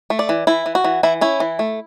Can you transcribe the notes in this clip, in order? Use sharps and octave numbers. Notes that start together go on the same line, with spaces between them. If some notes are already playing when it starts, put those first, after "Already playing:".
A3
D5
E3
E3 E4
E3
F#4
E3
E3 E4
C#4 E4
E3
A3